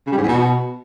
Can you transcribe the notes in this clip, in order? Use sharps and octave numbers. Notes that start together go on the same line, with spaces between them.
C#3
G3
G#2
E2
B2